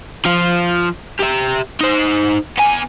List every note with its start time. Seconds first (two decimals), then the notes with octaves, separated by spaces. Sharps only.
0.25 F3 F4
1.19 G4 E5
1.80 D#4 C5
2.58 B3 G#5